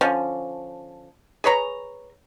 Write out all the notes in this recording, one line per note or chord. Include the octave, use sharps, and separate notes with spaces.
D3 F3 C#4
G#4 B4 C#5 A#5